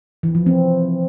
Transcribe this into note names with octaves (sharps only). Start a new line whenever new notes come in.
E3
F3
C4